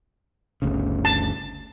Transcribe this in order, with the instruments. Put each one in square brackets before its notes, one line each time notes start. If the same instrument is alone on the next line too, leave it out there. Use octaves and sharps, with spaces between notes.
[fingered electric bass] G1 D2 C#3
[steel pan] A5